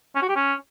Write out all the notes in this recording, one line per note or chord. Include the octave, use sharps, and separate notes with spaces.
C#4
F#4
G4
C#4